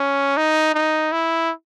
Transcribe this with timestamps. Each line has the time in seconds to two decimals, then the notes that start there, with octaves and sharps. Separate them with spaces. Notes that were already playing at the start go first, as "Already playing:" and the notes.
Already playing: C#4
0.37 D#4
0.75 D#4
1.12 E4